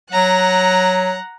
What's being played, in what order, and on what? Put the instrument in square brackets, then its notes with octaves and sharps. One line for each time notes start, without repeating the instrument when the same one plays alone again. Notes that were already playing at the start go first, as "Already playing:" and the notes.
[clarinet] F#3 [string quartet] F#5 A#5 F#6